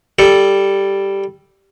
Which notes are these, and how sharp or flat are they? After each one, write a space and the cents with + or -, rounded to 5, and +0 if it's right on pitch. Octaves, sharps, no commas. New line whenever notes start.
G3 +0 A4 +0